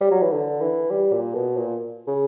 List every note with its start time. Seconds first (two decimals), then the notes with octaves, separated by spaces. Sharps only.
0.01 G3
0.11 F#3
0.22 E3
0.33 D3
0.61 E3
0.90 G3
1.13 A#2
1.34 B2
1.57 A#2
2.07 C#3